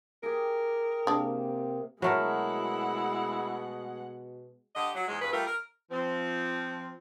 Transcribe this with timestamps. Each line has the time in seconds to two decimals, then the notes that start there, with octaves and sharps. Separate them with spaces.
0.23 G4 G#4 A#4
1.07 C3 A#3 D4 G#4
2.02 B2 F#3 G#3 A3 E4 A#4 F#5
4.75 D3 G4 D#5
4.95 F#3
5.08 E2 G#2 G#3
5.21 E2 G2 B4
5.33 G3 A3 F4 A#4
5.46 A#4
5.91 F3 C4